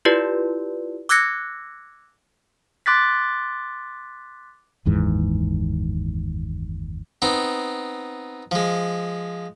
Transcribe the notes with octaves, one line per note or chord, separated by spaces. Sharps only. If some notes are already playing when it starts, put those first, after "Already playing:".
E4 F4 G4 B4 D5
D6 E6 F#6 G#6 A#6 C#7
C6 D6 F#6 A6 B6
F#1 D#2 G#2 E3
B3 C4 D#4
F3 G#3